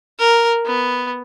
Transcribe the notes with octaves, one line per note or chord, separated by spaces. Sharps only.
A#4
B3